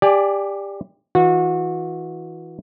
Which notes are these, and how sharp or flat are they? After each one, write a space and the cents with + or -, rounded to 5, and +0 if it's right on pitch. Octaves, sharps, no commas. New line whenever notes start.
G4 +25 D5 +0 G#5 +10
E3 -20 F#4 -30